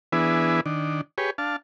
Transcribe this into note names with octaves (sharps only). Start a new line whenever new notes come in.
E3 B3 D4 E4 G#4 B4
D#3 D4
G4 G#4 B4 C#5
D4 F5 A5